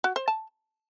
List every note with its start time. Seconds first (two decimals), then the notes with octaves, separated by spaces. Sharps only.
0.04 F#4
0.16 C5
0.28 A5